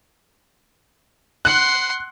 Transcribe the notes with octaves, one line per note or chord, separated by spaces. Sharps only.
F#5 C6 F#6